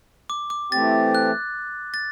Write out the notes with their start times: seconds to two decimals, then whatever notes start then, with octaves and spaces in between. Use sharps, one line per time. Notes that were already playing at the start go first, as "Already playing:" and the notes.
0.30 D6
0.50 D6
0.72 E3 A3 C4 G4 A6
1.15 F#6
1.94 A6